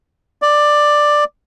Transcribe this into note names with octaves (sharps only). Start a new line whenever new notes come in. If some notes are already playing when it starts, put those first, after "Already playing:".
D5